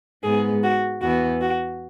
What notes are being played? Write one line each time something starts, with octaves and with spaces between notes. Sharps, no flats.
G#2 G#3 B3 G#4
F#4
E2 E3 B3 F#4
F#4